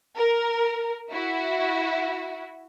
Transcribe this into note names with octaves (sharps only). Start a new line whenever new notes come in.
A#4
E4 F#4 E5